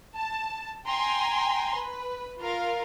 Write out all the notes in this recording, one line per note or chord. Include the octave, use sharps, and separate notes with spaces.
A5
G5 G#5 A#5 C6
B4
F4 A#4 F5